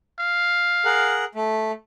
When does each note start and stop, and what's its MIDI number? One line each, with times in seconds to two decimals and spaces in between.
0.20 1.23 77
0.85 1.25 68
0.85 1.25 70
0.85 1.25 78
1.35 1.71 57